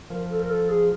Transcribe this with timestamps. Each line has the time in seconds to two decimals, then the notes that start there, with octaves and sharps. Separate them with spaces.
0.10 F3 A#4
0.30 A4
0.41 A#4
0.50 A4
0.69 G#4